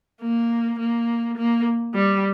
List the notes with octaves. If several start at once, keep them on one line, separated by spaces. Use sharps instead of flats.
A#3
A#3
A#3
G3